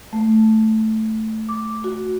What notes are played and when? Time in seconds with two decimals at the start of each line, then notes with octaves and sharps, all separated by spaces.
0.13 A3
1.49 D6
1.84 F#4